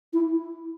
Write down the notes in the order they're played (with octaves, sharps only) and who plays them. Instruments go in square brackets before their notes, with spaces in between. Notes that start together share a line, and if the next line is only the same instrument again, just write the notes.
[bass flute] E4